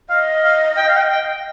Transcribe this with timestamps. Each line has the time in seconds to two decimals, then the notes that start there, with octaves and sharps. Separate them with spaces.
0.09 D#5 F5
0.43 F5
0.77 G5
0.87 F5
0.97 G5
1.10 G5